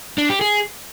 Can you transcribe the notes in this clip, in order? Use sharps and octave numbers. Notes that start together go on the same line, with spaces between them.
D4
G4
G#4